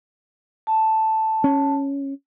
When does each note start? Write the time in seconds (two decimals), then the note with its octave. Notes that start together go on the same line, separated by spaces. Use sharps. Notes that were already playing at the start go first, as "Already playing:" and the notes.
0.67 A5
1.44 C#4